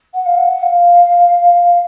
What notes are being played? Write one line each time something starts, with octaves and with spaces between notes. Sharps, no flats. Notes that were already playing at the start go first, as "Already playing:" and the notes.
F#5
F5
F#5
F5